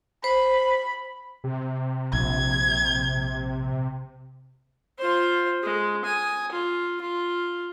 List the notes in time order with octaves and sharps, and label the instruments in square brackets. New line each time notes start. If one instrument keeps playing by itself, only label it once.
[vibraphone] C5 [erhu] B5
[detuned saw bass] C3
[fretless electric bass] A#1 [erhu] G#6
[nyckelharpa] F4 C5
G#3
G#5 D#6
F4
F4